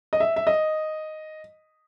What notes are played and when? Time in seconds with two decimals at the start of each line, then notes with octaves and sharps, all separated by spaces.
0.13 D#5
0.20 E5
0.36 E5
0.47 D#5